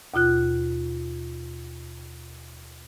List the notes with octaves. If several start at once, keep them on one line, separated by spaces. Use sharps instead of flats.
D#2 B2 F4 F#6